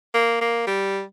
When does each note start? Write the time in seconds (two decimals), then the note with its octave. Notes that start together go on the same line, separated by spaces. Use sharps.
0.14 A#3
0.41 A#3
0.67 G3